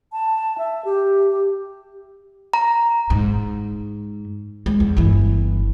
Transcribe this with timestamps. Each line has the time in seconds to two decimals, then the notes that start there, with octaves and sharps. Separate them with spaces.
0.12 A5
0.58 E5
0.85 G4
2.54 A#5
3.10 G#2
4.66 G#3
4.80 E2
4.97 G1 E3